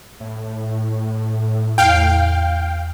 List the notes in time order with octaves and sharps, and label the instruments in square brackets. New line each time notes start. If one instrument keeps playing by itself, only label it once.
[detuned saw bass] A2
[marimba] E2 [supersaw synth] F5 G5